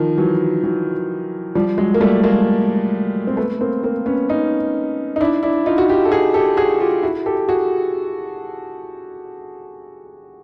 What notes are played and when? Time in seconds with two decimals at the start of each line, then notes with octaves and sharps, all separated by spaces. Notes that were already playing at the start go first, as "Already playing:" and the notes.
Already playing: D#3 F3
0.18 E3 F#3
0.63 E3 F#3
1.55 F3 G3
1.77 F#3 G#3
1.94 A#3
2.01 G3 A3
2.23 G#3 A#3
3.27 C4
3.37 A3 B3
3.61 A#3 C4
3.83 A#3 C4
4.06 B3 C#4
4.29 C#4 D#4
5.16 D#4
5.21 D4 E4
5.43 D4 E4
5.66 D#4 F4
5.78 F#4
5.89 F4 G4
6.05 A4
6.11 F#4 G#4
6.34 G4 A4
6.57 F#4 G#4
6.80 F4 G4
7.03 E4 F#4
7.26 G4 A4
7.49 F#4 G#4